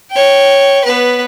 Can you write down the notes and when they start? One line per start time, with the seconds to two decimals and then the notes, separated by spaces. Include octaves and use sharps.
0.11 C#5 G5
0.85 B3 B4